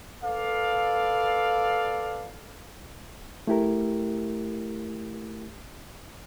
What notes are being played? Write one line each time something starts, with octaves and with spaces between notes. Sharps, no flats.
A4 B4 D5 F5
A3 E4 G4 A#4